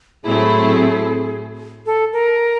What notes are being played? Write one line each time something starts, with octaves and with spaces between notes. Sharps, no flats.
A2 F#3 A3 C4 E4 G#4
A4
A#4